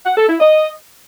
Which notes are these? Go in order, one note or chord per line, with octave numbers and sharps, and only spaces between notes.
F#5
A4
E4
D#5